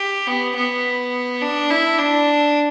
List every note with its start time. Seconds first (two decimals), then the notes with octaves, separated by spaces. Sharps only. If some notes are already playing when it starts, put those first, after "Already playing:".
Already playing: G4
0.27 B3
0.56 B3
1.41 D4
1.70 E4
1.99 D4